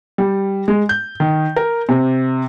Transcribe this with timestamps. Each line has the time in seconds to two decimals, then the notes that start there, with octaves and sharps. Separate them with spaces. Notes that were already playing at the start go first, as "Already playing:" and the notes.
0.18 G3
0.68 G#3
0.89 G6
1.20 D#3
1.56 A#4
1.89 C3